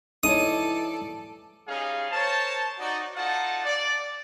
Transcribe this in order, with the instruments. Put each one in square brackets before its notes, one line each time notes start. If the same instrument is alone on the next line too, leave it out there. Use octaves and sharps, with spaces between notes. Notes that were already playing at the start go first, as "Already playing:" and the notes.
[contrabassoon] E3 [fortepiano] D#4 C#5 [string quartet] A4 D5 [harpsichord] D#6
[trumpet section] G3 C#4 D#4 G#4 F5
A#4 C5 C#5 A5
D#4 F#4 D5
D#4 F4 A4 D5 F#5 A5
D5